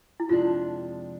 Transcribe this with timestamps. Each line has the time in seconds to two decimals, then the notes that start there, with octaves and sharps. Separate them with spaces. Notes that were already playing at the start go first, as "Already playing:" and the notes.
0.20 E4
0.29 F2 C3 F3 G#3 D4 F4